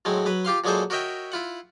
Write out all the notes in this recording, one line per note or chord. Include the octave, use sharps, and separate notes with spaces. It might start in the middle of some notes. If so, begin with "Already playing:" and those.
A2 F#3 G#3 C4
F#3 B4
F4 G4 F5 C6
A#2 F#3 G#3 G#4 A4 C5
F#4 A#4 C#5 D#5 E5 G5
E4 F4 F#5